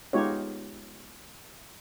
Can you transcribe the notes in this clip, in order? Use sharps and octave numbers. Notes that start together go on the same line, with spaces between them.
G#3 B3 D#4 F4 G4 C#5